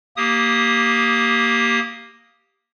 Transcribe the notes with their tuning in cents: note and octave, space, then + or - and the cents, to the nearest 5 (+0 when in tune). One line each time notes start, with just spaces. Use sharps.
A#3 +0 G4 +0 D#6 +0